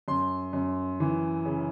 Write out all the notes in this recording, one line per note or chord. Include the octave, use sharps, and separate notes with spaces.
F#2 C6
F#2
E3
C#3